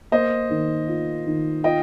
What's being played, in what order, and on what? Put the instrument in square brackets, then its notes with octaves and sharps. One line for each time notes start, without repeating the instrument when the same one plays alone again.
[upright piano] A#3 [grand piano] C5 D#5
[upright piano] D#3
F4
D#3
[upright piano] F4 [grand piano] D#5 G5